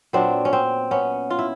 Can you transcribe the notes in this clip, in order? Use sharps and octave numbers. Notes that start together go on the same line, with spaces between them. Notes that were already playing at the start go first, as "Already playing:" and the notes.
A#2 F#3 B3 C4 D4
C#4
C4
B3 C#4
F4
E4